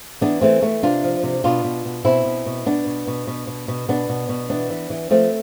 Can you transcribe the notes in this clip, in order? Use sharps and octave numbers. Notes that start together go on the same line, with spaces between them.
E3 B3 D4
E3 A3 C4
E3 A3
C3 D4 F4
F3
C3
B2 D4 F4
B2
B2
B2 C4 E4
B2
B2
B2 B3 D4
B2
B2
B2
B2
B2
B2 B3 D4
B2
B2
E3 B3 D4
E3
E3
F3 A3 C4